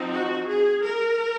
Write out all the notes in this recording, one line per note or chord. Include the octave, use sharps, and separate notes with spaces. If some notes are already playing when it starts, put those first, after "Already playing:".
Already playing: F3 C4 D#4
F#4
G#4
A#4